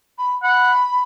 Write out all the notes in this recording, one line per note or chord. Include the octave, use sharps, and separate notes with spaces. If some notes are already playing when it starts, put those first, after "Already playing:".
B5
F#5 B5